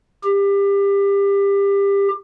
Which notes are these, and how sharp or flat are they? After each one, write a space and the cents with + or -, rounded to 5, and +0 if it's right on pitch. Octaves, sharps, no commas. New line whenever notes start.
G4 +25